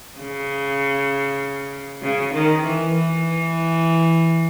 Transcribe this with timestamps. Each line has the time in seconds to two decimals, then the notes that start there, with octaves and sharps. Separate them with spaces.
0.19 C#3
2.02 C#3
2.33 D#3
2.63 E3
2.94 E3